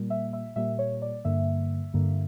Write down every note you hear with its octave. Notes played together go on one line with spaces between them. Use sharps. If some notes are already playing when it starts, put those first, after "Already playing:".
Already playing: A#2 G3 A#3
E5
E5
A#2 G3 A#3 E5
C#5
D5
G2 D3 A#3 E5
G2 D3 A#3